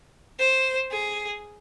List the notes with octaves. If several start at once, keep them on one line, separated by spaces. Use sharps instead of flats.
C5
G#4